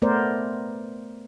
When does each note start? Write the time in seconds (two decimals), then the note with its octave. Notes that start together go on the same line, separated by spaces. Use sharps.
0.02 A3 B3 A#4 C5 D5